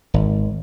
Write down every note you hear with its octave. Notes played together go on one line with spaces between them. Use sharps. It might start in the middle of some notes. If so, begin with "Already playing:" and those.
G#1